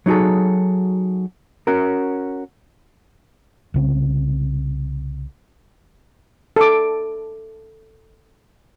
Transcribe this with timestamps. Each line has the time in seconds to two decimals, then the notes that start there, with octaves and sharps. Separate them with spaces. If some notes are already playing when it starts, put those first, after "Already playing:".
0.06 F#3 D#4 F#4 G#4 A4
1.67 C#4 F#4 A#4
3.74 C2 C#3 C4
6.56 A4 D6